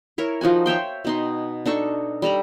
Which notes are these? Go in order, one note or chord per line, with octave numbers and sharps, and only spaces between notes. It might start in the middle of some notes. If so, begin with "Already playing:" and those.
E4 A#4 C#5
F3 D#4 F#4 G#5
C#5 E5 G5 C6
B2 D#4 C6
D4 D#4 A4 C#6
G3 A4 A#5 B5